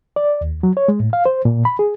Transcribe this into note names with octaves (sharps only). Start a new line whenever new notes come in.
D5
D#2
F#3
C#5
G#3
A2
F5
C5
A#2
B5
G#4